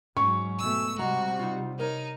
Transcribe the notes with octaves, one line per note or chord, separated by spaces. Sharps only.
G#2 F#3 C#4 C#6
B2 A3 E6
C3 G3 G#3 F#4 A#5
D#4 F4
D#4 A#4 C#5